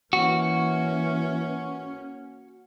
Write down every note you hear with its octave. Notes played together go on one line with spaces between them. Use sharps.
E3 A#3 C#4 F#4